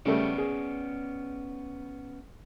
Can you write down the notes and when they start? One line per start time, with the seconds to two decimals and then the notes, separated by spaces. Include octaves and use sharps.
0.06 C#3 G3 A3 B3 C#4 D5
0.38 G#4